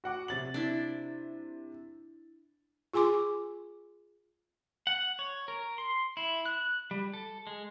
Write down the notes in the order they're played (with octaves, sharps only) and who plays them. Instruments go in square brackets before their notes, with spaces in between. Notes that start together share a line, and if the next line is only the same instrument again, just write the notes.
[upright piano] F#4 F#5 D6
C3 A6 F#7
[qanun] D4 E4
[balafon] F4 G#4 G#5 C6 D6
[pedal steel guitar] F#5
C#5
A#4
C6
E4
F#6
G3
A4
G#3